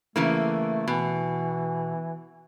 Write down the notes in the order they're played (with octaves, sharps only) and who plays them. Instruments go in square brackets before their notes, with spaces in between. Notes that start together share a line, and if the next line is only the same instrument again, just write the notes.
[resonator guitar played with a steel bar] C#3 E3 A#3 [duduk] A3
[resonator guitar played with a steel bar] B2 [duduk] E3